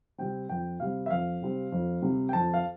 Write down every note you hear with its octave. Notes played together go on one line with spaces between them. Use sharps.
C3 G3 C4 G5
F2 G5
C3 G3 C4 F5
E5
F2 F5
C3 G3 C4
F2
C3 G3 C4
G5
F2 A5
F5